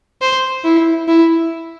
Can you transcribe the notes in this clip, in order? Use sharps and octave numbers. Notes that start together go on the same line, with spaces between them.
C5
E4
E4